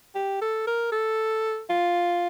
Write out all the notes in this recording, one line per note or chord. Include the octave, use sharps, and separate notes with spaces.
G4
A4
A#4
A4
F4